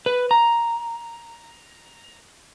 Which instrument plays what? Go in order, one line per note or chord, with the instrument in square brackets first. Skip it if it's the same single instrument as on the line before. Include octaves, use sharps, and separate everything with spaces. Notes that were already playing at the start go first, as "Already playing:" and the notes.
[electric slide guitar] B4
A#5